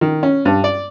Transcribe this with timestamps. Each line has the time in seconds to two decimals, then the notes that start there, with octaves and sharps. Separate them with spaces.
0.01 D#3
0.23 C#4
0.45 G2
0.64 D5